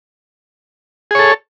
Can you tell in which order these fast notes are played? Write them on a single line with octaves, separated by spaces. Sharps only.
G#4 C#5 A4